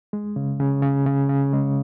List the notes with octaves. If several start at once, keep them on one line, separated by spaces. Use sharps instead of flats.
G#3
C#3
C#3
C#3
C#3
C#3
G#3